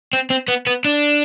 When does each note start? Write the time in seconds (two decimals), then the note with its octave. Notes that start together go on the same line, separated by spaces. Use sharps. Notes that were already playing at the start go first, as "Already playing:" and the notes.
0.13 C4
0.30 C4
0.48 B3
0.67 B3
0.85 D4